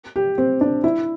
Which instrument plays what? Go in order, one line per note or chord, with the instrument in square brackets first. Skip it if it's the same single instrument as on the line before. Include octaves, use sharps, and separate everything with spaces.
[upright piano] G4
C4
D4
E4